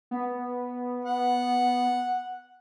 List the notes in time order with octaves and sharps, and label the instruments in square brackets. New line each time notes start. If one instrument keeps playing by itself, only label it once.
[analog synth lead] B3
[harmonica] F#5